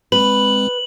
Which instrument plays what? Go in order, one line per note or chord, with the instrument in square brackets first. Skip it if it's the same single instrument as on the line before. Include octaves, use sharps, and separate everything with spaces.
[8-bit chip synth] G#3 C4 [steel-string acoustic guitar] B4 [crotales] F#7